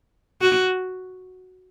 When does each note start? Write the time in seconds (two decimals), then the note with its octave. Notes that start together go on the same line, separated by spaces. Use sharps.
0.41 F#4